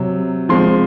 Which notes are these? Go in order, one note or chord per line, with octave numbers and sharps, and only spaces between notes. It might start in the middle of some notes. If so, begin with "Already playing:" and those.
Already playing: C3 F#3
F3 G#3 C4 C6